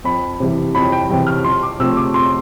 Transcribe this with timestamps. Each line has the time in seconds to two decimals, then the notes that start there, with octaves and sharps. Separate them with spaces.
0.04 F2 B5
0.40 C3 E3 G3
0.75 F2 B5
0.92 G5
1.09 C3 E3 G3 G5
1.27 F6
1.44 F2 C6
1.63 D6
1.79 C3 F3 A3 C4 E6
1.97 D6
2.14 F2 C6